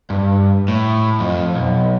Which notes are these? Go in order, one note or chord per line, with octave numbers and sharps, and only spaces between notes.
G2
A2
F2
B1